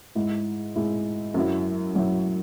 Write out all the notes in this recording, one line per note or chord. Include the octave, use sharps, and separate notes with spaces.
G#2 G#3 E4
G#2 G#3 E4
F#2 F#3 E4
F#2 F#3 E4